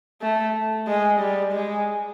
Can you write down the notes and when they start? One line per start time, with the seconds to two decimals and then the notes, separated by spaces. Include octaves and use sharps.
0.21 A3
0.87 G#3
1.20 G3
1.53 G#3